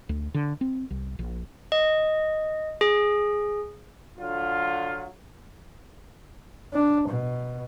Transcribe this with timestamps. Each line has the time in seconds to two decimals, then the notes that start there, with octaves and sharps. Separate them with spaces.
0.09 D2
0.34 D3
0.61 C4
0.90 C2
1.19 A#1
1.72 D#5
2.81 G#4
4.18 D3 F#3 F4
6.73 D4
7.09 B2